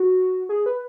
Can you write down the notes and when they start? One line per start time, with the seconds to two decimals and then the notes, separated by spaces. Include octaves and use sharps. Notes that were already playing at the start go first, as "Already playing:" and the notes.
Already playing: F#4
0.49 G#4
0.66 B4